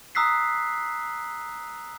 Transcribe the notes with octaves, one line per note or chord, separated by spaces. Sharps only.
A#5 D#6 E6 F#6 B6 C7